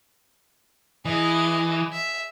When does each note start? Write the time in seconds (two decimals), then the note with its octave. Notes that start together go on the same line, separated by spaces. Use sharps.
1.05 E3 G#4 D#5
1.92 E5